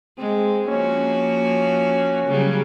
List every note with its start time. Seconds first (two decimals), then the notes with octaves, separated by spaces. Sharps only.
0.18 G#3 C4
0.68 F3 A#3 C#4 F#4
2.27 C#3 F#3 G3